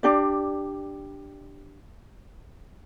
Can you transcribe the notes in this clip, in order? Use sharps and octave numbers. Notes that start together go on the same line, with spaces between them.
D4 G4 D5